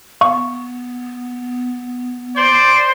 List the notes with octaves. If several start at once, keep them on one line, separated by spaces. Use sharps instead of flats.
B3 F5 C#6
C5 D5 C6